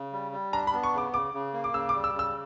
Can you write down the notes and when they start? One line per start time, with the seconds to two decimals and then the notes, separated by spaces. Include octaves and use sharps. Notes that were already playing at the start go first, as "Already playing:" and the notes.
Already playing: C#3
0.12 G3
0.32 G3
0.52 D4 A#5
0.67 B5
0.73 B3
0.83 C#6
0.93 C#3 D6
1.13 C#3 D6
1.34 C#3
1.53 A#3
1.64 D6
1.73 C#3 E6
1.89 D6
1.94 G3
2.04 E6
2.14 C#3
2.19 E6